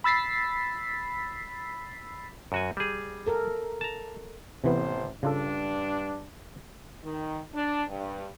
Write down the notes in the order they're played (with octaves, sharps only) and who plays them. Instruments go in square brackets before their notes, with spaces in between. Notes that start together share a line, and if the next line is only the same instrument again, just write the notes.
[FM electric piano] B5 E6 A6 B6 C7
[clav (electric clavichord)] F#2 F#4 G#5
G3 G#4
[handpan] A4 A#4
[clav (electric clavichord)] A5 A#5
[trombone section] A1 A2 C5 [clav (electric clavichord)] C3 E3 B3
[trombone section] G2 D4 [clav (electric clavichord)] C#3 F4 A4
[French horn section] D#3
D4
G2